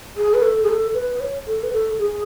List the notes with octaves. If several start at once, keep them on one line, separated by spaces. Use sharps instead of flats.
G#4
B4
A4
G#4
A4
B4
B4
C#5
A4
B4
A4
G#4